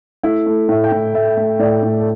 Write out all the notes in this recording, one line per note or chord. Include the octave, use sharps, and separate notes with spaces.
A3 E4
A3
A2 E5
G5
A2
A3 E5
A3
A2 D5
A2
A4